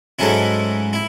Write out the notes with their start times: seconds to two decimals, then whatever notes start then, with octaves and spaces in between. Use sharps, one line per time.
0.19 G#2 F#3 A3 C#4 E4
0.93 E4